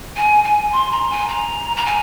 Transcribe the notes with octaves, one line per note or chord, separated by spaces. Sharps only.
G#5
G#5
C6
A#5
G#5
A#5
A#5
G#5